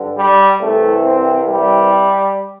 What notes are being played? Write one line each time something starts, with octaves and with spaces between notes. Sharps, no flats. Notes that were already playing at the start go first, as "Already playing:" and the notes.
Already playing: G2 D3
G3
C2 C3 E3 A3
C4
G3